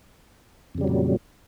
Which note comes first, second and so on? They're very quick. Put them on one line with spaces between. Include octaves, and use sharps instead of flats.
F2 C#3 G3 F#3 A#2